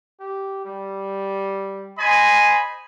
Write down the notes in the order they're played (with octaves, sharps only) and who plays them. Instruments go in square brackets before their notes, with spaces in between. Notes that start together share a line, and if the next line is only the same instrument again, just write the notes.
[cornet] G4
G3
[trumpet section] C5 D#5 G#5 [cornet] B5